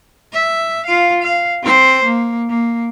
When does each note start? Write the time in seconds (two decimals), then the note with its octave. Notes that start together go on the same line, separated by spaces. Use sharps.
0.33 E5
0.86 F4 F5
1.22 F5
1.63 C4 C5
2.05 A#3
2.49 A#3